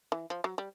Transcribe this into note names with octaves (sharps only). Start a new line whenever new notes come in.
E3
F3
F#3
G3